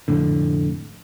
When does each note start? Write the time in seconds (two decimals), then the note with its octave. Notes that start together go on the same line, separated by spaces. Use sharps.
0.08 F1 F2 A2 D3